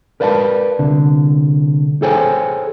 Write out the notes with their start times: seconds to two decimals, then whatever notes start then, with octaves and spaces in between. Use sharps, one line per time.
0.20 A#4 B4 D5 F5 F#5 A5
0.79 C2 D3
2.02 G#4 A4 C5 C#5 G5 G#5